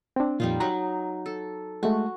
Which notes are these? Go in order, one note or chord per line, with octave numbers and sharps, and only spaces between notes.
C4 D4
F2 A#2 G3 D#4 F4
F#3 D#4 F#4 A#5
A4
G#3 A3 F#4